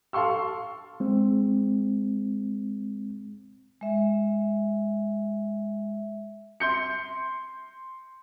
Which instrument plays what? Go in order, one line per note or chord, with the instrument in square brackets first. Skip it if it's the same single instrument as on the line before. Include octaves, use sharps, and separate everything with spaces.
[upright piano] A4 F5 C6 C#6 E6
[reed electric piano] G#3 C4
[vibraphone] G#3 E5
[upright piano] C6 G6 C#7